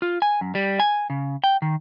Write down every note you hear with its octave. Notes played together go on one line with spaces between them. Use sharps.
F4
G#5
F#2
G3
G#5
C#3
G5
D#3